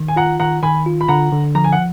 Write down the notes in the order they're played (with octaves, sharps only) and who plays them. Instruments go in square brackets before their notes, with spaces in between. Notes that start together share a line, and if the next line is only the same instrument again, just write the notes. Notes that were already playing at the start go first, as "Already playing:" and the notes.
Already playing: [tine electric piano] D#3
[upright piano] G#5
[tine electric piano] F4 [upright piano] F#5 A#5
[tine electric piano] D#3 [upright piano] F#5 A#5
[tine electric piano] D#3 [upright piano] G#5 B5
[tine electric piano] F4
[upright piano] B5
[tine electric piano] D3 [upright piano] F#5 A#5
[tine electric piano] D3
[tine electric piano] F3 [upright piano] A#5
[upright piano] G#5
F#5